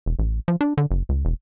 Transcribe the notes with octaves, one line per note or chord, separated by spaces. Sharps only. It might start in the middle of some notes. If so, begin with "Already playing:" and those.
E1
A1
F3
D4
D3
F#1
C#2
E1